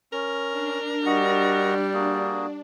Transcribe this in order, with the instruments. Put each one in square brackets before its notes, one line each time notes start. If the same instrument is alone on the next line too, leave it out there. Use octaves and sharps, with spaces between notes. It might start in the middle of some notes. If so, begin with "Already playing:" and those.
[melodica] C#4 [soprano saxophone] A#4
[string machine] D4
[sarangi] G3 [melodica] F#4 D#5 F#5
[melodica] A#3 F#4 G#4